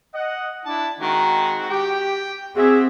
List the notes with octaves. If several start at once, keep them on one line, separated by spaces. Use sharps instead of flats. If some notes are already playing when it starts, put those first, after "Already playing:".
D#5 F#5
D4 E4 A5
D#3 G#3 C4 F#4
G4 G5
C4 F#4 G#4 D5 E5